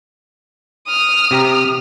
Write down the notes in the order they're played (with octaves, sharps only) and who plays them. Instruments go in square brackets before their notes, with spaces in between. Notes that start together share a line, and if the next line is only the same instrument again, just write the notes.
[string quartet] D#6 F6
[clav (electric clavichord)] C3 G4 A#5